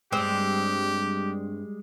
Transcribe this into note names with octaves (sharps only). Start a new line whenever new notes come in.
G2 G3 G#3 C4 G4